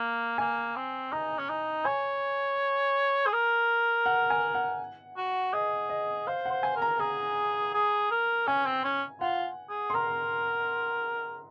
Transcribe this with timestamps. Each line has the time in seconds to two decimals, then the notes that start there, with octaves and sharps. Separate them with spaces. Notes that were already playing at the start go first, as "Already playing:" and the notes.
Already playing: A#3
0.38 A#3 G#5
0.76 C4
1.12 D#4 A#5
1.38 C#4
1.49 D#4
1.85 C#5 G#5
3.27 G#4
3.33 A#4
4.06 F#5
4.30 G#5
4.55 F#5
5.17 F#4
5.53 G#4 D#5
5.89 D#5
6.27 C5 F5
6.45 F#5
6.51 C5
6.63 G#5
6.76 A#4
6.82 A#5
6.99 G#4 A#5
7.74 G#4
8.11 A#4
8.47 C#4 G#5
8.65 C4
8.84 C#4
9.21 F4 F#5
9.69 G#4
9.90 C6
9.94 A#4 A#5